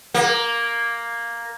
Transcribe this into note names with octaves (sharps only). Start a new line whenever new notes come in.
A#3